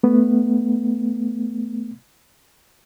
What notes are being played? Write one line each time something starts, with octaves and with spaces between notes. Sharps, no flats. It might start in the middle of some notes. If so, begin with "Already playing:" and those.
A3 B3